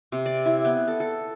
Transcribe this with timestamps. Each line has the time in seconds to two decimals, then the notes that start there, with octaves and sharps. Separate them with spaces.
0.12 C3
0.26 D5
0.46 E4
0.65 B3
0.88 A4
1.00 A4